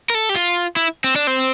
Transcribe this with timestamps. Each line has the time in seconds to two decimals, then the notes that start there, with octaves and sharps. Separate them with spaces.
0.10 A#4
0.15 A4
0.29 G4
0.35 F4
0.76 E4
1.04 C4
1.16 D4
1.27 C4